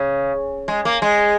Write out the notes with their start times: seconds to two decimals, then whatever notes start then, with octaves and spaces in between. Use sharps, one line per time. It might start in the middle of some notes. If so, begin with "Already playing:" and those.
Already playing: C#3
0.68 G#3
0.85 A#3
1.02 G#3